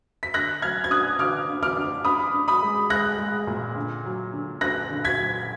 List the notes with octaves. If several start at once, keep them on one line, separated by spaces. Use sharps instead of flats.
B6
D3 F#6 A#6
F#3 F6 G#6
G#6
D4 D#6 F#6
D3 D6 F6
D3
D6 F6
D4
D4 B5 D#6
D4
B5 D#6
G#3
G#3 F#6 A#6
G#3
A#2
D3
F#3
D3
D3 F#6 A#6
D3
G#6 B6
F#3